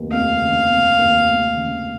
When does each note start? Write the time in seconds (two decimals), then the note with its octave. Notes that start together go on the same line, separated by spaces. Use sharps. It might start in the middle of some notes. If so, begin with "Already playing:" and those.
Already playing: F1 D#2
0.12 F1 F5
0.41 C#3
0.69 F1
0.99 D#2
1.27 F1
1.56 C#3